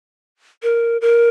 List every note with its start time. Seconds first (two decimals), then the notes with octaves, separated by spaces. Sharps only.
0.63 A#4
1.01 A#4